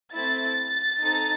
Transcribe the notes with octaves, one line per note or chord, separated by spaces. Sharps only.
A3 C4 E4 A6
C4 D#4 A4